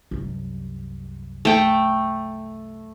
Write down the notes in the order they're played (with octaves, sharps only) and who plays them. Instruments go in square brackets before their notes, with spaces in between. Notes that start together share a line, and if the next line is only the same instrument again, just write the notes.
[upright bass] C2 F#2
[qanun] A3 G5